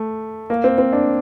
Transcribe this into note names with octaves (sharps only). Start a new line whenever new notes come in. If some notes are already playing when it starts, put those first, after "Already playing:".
Already playing: A3
A#3
C4
C4
D4